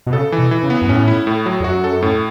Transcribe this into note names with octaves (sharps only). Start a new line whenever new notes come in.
B2
C#3 A4
E3
B2
E3
C#3
B3
F#2
A2 C#4
E4
A2
F#3
E2
F#2 F#4
A4
A2